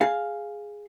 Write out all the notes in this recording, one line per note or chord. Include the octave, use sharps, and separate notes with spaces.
G#4 F5